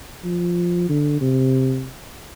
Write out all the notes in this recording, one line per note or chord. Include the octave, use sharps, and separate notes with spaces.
F3
D3
C3